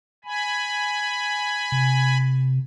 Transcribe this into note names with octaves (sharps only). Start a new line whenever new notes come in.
G#5 B5
C3